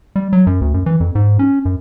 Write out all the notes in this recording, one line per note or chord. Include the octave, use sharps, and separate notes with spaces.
G3
F#3
F#2
D2
F#2
E3
F2
G#2
C#4
F#2